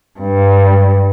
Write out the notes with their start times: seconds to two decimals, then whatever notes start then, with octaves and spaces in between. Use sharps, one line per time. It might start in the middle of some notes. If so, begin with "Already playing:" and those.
0.20 G2